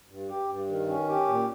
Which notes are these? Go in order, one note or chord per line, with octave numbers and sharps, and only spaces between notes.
G2
G4
G2
D#3
C#4
G4
A#2